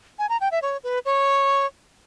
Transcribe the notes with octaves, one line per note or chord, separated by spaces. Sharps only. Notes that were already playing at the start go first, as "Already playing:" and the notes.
G#5
A#5
G5
E5
C#5
B4
C#5